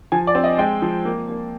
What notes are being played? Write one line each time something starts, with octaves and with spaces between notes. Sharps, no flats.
F3 G#5
D5
C4
D#5
G#3 G5
F3
A#3
A#3